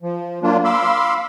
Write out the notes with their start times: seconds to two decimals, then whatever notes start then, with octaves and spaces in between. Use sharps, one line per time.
0.02 F3
0.43 F#3 A#3 D4 F4
0.64 F5 B5 C6 D6 E6